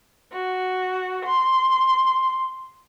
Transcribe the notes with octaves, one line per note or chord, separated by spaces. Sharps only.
F#4
C6